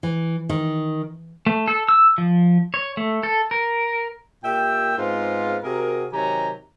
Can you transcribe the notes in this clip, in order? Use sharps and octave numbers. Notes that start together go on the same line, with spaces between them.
E3
D#3
A3
A4
E6
F3
C#5
A3
A4
A#4
A#2 G4 E5 G5
G#2 G#3 B3 C4 F4
C3 F#4 G#4 A#4
C3 D#3 F#3 G4 G#5 A#5